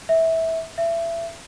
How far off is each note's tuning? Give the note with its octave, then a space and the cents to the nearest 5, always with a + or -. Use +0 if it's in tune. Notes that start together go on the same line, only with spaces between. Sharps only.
E5 -20
E5 +25